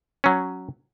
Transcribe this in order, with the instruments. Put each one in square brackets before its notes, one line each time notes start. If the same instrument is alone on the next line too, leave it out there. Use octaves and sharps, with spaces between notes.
[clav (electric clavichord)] F#3 C#4